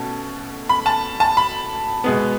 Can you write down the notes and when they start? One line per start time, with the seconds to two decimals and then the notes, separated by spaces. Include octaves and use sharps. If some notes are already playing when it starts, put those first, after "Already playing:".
Already playing: B2 A3 C#4 A5
0.69 B5
0.86 A5
1.20 A5
1.37 B5
2.04 B2 G#3 B3